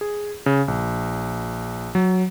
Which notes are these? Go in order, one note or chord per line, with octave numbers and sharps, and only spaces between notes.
G#4
C#3
A#1
F#3